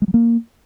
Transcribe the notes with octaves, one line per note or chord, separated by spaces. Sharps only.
G#3
F#3
A#3